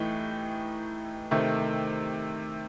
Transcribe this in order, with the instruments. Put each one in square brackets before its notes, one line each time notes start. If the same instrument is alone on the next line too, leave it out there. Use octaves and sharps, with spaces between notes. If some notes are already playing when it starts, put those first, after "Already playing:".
Already playing: [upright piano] A2 E3 A3 D#4 G4
C3 D#3 A3